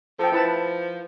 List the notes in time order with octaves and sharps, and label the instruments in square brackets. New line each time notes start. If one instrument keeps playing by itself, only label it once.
[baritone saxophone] F3 [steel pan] A4 G5
[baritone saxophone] F3 [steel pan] E4 B4 A5